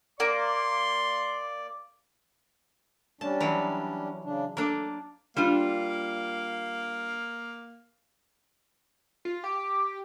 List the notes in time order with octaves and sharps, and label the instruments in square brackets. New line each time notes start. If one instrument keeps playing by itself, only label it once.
[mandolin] A#3 [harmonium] D5 [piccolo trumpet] C6
[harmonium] G3 C#4 D4 [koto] A5
[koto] E3 F#3
[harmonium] C#3 D4
[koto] A#3 D4 [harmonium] A4
[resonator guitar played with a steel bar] G3 D4 F4 [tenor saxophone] A#3
[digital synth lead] F4
[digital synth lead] G4 [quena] D6